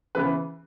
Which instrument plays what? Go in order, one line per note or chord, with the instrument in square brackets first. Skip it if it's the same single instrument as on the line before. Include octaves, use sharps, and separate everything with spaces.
[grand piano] C#3 E3 B3 B4